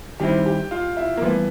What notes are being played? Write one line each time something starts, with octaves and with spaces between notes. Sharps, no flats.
D#3 G3 C4 E4 G4
G4
F4
E4
A#3
G2 E3 A3 B3